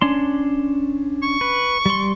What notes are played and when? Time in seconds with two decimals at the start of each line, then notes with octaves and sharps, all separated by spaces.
0.02 C#4 D4 C6
1.23 C#6
1.41 B4
1.86 G3 C6